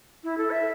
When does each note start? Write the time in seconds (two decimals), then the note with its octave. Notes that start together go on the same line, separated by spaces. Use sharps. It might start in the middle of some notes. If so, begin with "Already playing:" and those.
0.24 E4
0.38 A4
0.51 E5